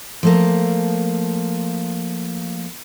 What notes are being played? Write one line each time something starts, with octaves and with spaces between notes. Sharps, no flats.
F3 A3 A#3